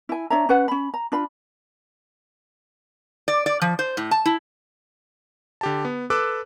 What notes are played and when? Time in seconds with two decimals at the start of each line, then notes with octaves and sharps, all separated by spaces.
0.09 E4 G#5
0.30 D4 C#5 E5 A#5
0.49 C#4 B4 F#5
0.68 C#4 B5
0.94 A#5
1.12 D4 F4 B5
3.28 D5
3.46 D5
3.62 F3
3.79 C5
3.97 A2
4.11 A5
4.26 E4
5.61 D3 G4 A5
5.85 B3
6.10 A4 B4 D6 E6 F#6